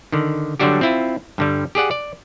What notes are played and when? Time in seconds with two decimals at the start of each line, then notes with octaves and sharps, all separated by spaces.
0.12 D3 D#3
0.60 D3 F#3 G3 D4 F#4 G4
0.81 C4 E4 F4
1.38 G2 D3 G3
1.75 G4 G#4 D5 F#5
1.91 D5